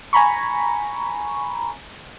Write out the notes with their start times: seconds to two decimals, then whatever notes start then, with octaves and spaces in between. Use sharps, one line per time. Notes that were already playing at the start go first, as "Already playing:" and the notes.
0.13 G#5 A#5 B5 C#6